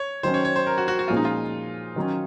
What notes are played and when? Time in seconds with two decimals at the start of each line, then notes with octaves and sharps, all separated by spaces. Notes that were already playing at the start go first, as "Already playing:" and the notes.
Already playing: C#5
0.23 D#3 F#3 C#4 C5
0.34 C#5
0.45 C#5
0.56 C5
0.66 A#4
0.78 F#4
0.88 F#4
0.99 F#4
1.08 A#2 F3 G#3 C#4 F4
1.17 D#4
1.25 F4
1.96 D#3 F#3 C#4